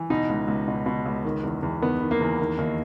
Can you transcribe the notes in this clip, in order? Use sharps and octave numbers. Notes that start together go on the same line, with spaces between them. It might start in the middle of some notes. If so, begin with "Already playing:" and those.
Already playing: E3
B2 D#4
C#2
C#2
B2
B2
C#2
D#3
E2
E2
D#3 B3
D#3
A#3
E2
D#3
D#2